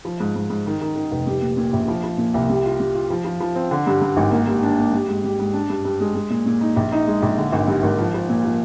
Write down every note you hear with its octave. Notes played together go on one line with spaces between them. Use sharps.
F3
G#2
G#2
G#2
D#3
D#3
D#3
F1
G3
A#2
A#2
A#1
F3
F3
A#2
C2
G3
F4
G3
F4
F3
F3
F3
C4
D3
G2
G2
G#1
A#3
G2
D4
A#3
G3
G#2
G3
G#2
D4
G2
G2
G#3
G#3
A#2
A#2
D#4
A#1
D#4
G#3
A#1
D3
G#1
G2
G#1
F3
F3
A#2
F3